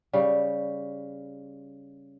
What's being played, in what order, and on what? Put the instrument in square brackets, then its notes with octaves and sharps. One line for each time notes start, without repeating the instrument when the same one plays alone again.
[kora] C#3 G3